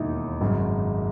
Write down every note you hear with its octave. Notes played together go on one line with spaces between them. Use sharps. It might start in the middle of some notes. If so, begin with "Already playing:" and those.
Already playing: E1 D#2 D#3 D#4 E4
G#1 F#2 C#3 G#3